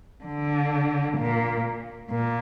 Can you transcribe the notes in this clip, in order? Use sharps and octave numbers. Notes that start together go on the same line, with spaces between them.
D3
A#2
A#2